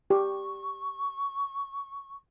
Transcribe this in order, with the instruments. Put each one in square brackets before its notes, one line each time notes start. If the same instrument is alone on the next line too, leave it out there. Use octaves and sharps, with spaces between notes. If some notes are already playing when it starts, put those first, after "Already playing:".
[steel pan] G4 [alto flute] C#6